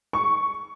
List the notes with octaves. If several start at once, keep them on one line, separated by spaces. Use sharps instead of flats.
C#6